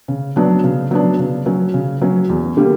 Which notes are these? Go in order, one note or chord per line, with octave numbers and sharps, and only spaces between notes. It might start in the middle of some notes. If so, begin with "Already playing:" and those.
C#3
F#3 B3 D4
C#3
F#3 B3 D4
C#3
F#3 C#4
C#3
F#3 C#4
E2
D3 G3 A#3